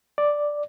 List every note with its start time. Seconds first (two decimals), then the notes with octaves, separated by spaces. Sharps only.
0.18 D5